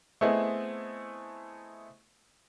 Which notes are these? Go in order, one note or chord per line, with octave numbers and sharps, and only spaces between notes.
A3 B3 C4 E4 G#4 D#5